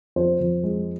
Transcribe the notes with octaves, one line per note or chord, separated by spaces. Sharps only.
F2 C5
F2
G#3